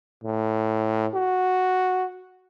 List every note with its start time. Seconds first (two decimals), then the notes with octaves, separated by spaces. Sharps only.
0.24 A2
1.15 F#4